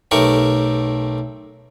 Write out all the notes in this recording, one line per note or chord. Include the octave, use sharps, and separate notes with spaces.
B1 A3 G4 A#4 C#6